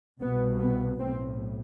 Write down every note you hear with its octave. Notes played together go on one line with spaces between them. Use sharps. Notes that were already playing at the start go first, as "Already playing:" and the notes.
C2 B2 B3
B3
B1 A2 C4